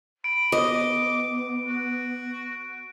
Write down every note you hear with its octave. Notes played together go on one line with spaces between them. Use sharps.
B5 D7
B3 D#5 D6
F#4